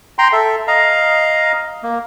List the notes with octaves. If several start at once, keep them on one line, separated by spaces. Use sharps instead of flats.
G5 A#5 C6
A4 E5
D#5 F5 A#5
A#3